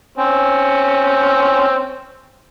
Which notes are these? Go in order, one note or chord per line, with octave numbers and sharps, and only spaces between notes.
C4 C#4